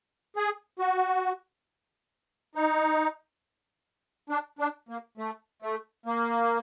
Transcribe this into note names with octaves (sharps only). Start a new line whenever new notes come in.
G#4
F#4
D#4
D4
D4
A#3
A3
A3
A#3